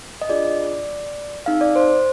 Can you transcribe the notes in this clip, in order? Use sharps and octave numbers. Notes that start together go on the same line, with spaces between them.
D#5
D4 F4 G#4 D5
C4 D#4 G#4 F5
D5
C5